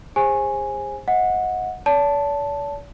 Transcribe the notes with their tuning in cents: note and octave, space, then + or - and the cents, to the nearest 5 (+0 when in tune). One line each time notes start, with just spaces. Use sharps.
G#4 -35 C5 +30 G#5 +0
D#5 +30 F#5 -20
D5 -45 A5 +0